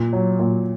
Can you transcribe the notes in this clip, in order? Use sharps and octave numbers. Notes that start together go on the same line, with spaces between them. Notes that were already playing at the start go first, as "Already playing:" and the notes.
Already playing: A#2
F#3
A#2